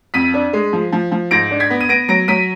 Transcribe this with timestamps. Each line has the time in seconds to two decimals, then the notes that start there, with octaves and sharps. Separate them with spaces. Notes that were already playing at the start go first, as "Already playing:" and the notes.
0.14 F2 B6 D#7
0.34 D4
0.53 G#3
0.73 F3
0.92 F3
1.11 F3
1.31 G#2 A#6 D7
1.51 D4
1.60 G#6 B6
1.70 B3
1.81 D#7
1.89 B3 A#6 D7
2.09 F#3 A#6 D7
2.28 F#3 B6 D#7